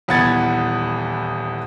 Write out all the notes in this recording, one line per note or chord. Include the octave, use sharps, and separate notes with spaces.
D#1 E2 B4 F#5 G#6 A6